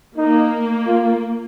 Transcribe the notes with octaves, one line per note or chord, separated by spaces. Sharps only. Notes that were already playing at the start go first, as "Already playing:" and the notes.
A#3 D#4
F4